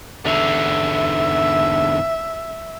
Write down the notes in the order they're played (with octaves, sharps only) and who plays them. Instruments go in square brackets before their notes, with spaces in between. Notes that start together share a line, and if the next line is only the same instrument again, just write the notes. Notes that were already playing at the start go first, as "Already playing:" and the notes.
[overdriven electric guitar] E2 D3 [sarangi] E5